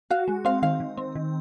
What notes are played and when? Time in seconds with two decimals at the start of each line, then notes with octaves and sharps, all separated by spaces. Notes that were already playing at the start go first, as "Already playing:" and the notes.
0.11 F#4 F5
0.28 G#3
0.45 C4 F5
0.62 D#3 F5
0.80 D#3
0.97 C4
1.15 D#3